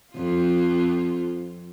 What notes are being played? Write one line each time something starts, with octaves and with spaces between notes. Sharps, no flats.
F2 F4